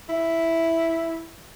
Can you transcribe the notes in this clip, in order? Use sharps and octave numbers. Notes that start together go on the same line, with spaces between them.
E4